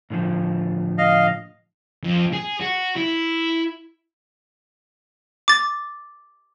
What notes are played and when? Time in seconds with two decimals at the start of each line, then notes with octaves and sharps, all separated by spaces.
0.10 A2 D3 F3
0.98 D#5 F5
2.04 F2
2.33 G#4
2.61 F#4
2.96 E4
5.48 D6 A6